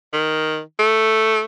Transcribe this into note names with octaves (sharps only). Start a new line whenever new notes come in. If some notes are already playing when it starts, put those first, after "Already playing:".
D#3
A3